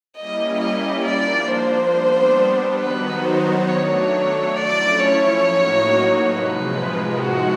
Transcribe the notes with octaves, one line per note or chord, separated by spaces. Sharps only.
G3 A#3 C#4 E4 G4 D#5
D#5
F3 A#3 D4 D5
C5
G3 B3 D4
D#3 F#3 B3 D#4 F#4 B4
C5
F#3 A3 D4 C#5
F3 A3 C#4 E4 D5
C#5
A2 F#3 A#3 D#4 F#4
C3 F3 G#3 B4
A2 F3 G#3 C4 D#4 F#4